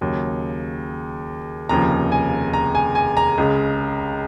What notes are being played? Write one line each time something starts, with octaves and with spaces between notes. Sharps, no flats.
D#2 C#3 F#3
F1 D#2 C#3 F3 A#5
G#5
A#5
G#5
G#5
A#5
C#2 C#3 G#3